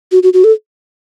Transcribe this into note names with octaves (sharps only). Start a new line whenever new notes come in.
F#4
F#4
F#4
A4